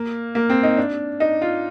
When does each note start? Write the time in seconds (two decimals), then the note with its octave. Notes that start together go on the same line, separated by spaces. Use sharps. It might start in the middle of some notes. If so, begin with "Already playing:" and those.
Already playing: A#3
0.35 A#3
0.50 C4
0.63 D#4
0.77 D4
1.20 D#4
1.42 F4